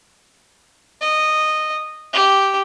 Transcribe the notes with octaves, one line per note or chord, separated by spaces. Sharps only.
D#5
G4